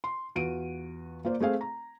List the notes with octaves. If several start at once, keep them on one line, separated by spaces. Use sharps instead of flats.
C6
E2 F4 F#4 D7 D#7
A#3 F4 C5 D5
A3 C4 G#4 F5
A#5